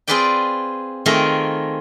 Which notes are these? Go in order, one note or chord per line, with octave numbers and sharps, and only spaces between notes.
C4 F4 G#4 B4 D5 G5
D#3 A3 C4 F4 G#4 A#4